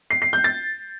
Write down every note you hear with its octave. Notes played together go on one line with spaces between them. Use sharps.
C7
C7
G6
A6